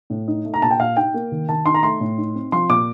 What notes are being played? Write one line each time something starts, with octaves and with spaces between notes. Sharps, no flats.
A2
D#4
A3
A#5
A#2 A5
G5
A#2 F5
D#4 G5
A#3
D#3
D#3 A5
D#4 C6
A#5
A3 C6
A2
D#4
C4
F3 C6
A#2 D6